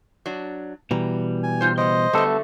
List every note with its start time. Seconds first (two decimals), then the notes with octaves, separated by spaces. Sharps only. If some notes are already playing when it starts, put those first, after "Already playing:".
0.26 F#3 D4
0.91 B2 E3 G3 A#5
1.43 G#5
1.61 D#4 F4 C5
1.78 C#3 B3 C5 D#5
2.13 D3 F#3 G3 A3 B3 A4